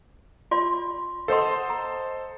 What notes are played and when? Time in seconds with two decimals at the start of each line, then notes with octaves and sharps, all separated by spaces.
0.51 F4 D5 C6
1.28 A4 C5 D#5 F#5 C6
1.70 A#5